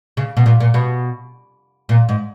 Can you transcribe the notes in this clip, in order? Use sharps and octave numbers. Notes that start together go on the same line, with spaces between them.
C#3
B2
A#2
A#2
B2
A#2
G#2